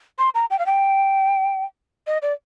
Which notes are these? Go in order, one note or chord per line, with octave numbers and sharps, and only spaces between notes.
C6
A#5
G5
F5
G5
D#5
D5